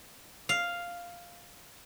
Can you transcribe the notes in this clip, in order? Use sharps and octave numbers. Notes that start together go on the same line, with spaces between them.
F5